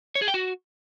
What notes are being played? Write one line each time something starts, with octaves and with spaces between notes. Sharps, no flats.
C#5
G#4
G5
F#4